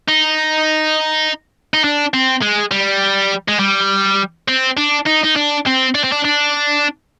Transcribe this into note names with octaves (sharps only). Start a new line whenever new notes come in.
D#4
D#4
D4
C4
G#3
G3
G#3
G3
C4
D4
D#4
D#4
D4
C4
D4
C4
D4
D4